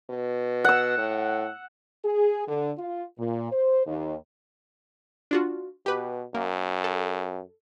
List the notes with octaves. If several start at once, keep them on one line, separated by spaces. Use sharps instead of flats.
B2
F#5 E6
A2
G#4
D3
F4
A#2
C5
D#2
D4 F4 F#4
B2 G4 B4
F#2 A#3
A4